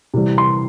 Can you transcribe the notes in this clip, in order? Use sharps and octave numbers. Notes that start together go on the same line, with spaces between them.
C3 E3 G3
C6